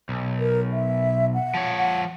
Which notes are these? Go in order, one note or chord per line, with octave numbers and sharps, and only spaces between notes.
B1
A#4
E5
F#5
F3 C#5
F#5